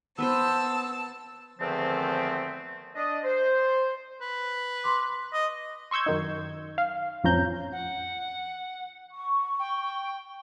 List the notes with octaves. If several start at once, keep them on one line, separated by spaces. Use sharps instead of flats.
B3 B4 C5 A5 E6
E2 D3 D#3 F3 A3 C4
D4 D#5
C5
B4
C6 D6
D#5
C6 C#6 E6 G6 G#6
F#2 D#3 D#4
F5
A1 F2 F3 C#4 A#5 G6
F#5
C#6
G5